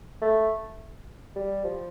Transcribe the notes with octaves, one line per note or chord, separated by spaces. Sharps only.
A3
G3
F3